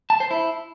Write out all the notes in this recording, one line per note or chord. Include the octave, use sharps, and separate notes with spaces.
A5
C5
E4